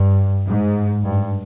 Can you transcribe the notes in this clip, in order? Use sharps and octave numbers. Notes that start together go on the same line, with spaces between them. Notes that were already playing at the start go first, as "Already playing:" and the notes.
Already playing: G2
G#2
G2